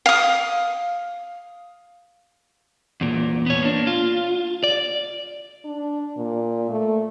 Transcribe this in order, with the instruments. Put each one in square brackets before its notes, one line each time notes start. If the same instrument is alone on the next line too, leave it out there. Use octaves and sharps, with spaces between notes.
[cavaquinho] F5 D#6
[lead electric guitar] E2 A#2
B3 C#5
A#3 D4
F4
D5
[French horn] D4
A#2
A3